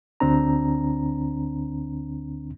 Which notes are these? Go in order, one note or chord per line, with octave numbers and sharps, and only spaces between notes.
D2 D3 C4 D4 A#5